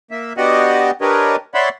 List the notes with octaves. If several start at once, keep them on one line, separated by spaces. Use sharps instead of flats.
A#3 E5
B3 D4 F#4 G4 D#5 F#5
D4 G4 A#4 B4 C#5 D#5
C#5 D5 E5 F#5 B5 C6